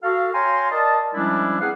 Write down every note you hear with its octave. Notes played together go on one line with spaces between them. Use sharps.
F#4 A4 F5
C#5 F5 G5 G#5 A#5 C6
A#4 D5 D#5 A5
F3 G3 G#3 C#4 D4 E4
C4 G#4 B4 F5 F#5